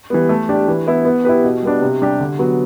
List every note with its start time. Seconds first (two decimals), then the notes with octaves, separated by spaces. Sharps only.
0.10 E3 G3 B3
0.29 A3
0.49 D4 G4 D5
0.68 E3
0.87 B3 E4
1.05 B3
1.25 E4 G4 B4
1.44 B2
1.63 G3 B3 D4
1.82 C3
2.01 G3 D4 G4
2.20 D3
2.39 F#3 B3